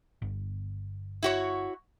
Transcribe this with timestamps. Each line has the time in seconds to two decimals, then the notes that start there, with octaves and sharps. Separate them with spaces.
0.22 G1
1.22 E4 F#4 C#5